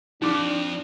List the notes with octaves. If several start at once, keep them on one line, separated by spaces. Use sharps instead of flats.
F2 D4 D#4 D6